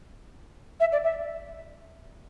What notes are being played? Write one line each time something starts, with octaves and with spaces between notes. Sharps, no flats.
E5
D5
E5